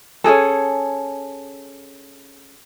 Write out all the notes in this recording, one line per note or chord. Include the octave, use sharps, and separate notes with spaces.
C#4 D#4 G#4 A4